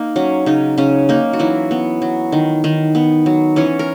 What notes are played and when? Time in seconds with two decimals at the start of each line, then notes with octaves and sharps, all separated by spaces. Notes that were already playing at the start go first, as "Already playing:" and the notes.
Already playing: A#3 D#4
0.16 F#3 C#4
0.46 C#3 D#4
0.78 C#3 C#4
1.09 A#3 D#4
1.33 F#4
1.39 E3 F#3 E4
1.71 B3
2.02 F#3
2.32 D#3
2.64 D#3
2.95 B3
3.26 F#3
3.56 E3 C#4 C#5
3.79 A#4